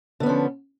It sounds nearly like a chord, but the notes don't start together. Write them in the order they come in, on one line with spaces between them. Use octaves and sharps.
D3 B3 C#4 F3